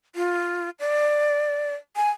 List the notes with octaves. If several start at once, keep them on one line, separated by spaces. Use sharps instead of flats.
F4
D5
G#5